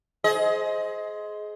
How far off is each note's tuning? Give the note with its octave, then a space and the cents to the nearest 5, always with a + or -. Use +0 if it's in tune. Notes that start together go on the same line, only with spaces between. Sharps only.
G#4 +20 C5 +0 D#5 +15